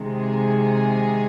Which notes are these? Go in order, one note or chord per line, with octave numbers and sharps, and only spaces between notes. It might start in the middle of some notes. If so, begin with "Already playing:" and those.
Already playing: C3 D#3 G#3
G#4 G#5